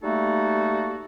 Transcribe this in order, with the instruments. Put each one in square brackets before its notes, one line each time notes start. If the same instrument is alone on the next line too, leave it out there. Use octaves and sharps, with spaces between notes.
[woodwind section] G3 A3 A#3 D#4 F#4 A4